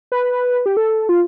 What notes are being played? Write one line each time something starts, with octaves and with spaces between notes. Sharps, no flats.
B4
G4
A4
F4